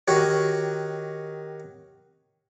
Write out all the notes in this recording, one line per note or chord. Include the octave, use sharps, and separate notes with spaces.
D#3 F#4 G4 C#5